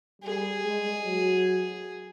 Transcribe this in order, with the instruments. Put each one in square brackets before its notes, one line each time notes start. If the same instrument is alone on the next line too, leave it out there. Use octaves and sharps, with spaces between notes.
[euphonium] G3 [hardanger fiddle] G#4
[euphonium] G#3
F#3